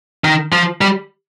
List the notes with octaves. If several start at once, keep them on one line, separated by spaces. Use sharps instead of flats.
D#3
F3
G3